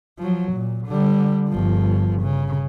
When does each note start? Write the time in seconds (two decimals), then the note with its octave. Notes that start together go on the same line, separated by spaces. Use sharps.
0.19 F3 F#3
0.53 A#2
0.87 D3 G3
1.49 G1 F3
2.22 C#3